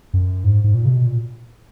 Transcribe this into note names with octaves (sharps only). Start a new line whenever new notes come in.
F#2
G#2
G#2
A#2
C#3
B2
A#2